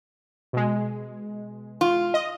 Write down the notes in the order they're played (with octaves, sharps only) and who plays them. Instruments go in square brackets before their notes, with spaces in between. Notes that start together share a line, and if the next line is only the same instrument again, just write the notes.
[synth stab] B2 G#3
[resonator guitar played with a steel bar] F4
[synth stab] D#5